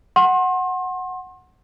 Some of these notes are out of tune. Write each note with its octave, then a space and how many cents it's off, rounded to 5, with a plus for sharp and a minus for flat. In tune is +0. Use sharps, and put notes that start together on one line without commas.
F#5 +0 C6 +35